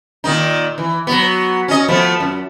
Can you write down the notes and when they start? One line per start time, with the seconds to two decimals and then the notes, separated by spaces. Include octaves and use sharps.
0.24 A#2 D#3 D#4
0.78 E3
1.07 F#3 B3
1.68 C#4 D#5
1.88 F3 A3 B3
2.20 F#2